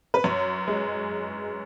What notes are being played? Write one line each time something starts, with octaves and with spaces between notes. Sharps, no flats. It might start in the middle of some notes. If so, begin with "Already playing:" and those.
B4
F#2 C#5
G#3